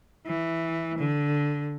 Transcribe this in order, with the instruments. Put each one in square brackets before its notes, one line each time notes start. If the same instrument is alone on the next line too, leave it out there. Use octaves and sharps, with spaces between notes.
[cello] E3
D3